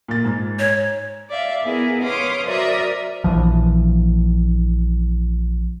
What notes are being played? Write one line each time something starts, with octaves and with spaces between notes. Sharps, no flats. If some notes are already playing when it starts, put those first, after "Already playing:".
A#2 A6
G#2
C#5
D5 E5 F5
B3 E4 G#4 A#4
B4 C#5 F5 C6 D6 D#6
F#3 A#4 C5 D5 E5 D#6
A#1 E3 F3